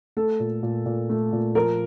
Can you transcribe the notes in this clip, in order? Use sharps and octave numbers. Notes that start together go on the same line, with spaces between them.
A3 A4
A#2
A#2
A#2
A3
A#2
F3 A#4